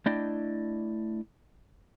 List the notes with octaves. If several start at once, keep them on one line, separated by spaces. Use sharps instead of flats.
A3 D4 E4 D5 D#5 G5